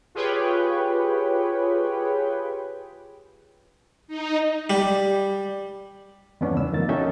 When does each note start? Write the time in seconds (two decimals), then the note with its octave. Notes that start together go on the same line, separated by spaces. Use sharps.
0.15 F4 G4 G#4 B4 C#5 G5
4.08 D#4
4.70 G3
6.41 E2 G2 B3 C#4 D4
6.54 C#2 E6
6.72 F2 D#3 A#3 A6
6.89 C#4 D#4 F#4 A4 E5 G5